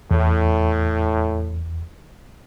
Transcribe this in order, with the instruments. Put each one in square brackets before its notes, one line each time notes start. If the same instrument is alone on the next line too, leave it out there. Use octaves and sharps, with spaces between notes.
[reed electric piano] E2 [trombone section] A2